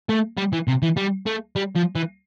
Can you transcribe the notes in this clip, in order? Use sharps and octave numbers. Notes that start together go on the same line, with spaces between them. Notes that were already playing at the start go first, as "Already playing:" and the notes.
A3
G3
E3
C3
E3
G3
A3
G3
F3
E3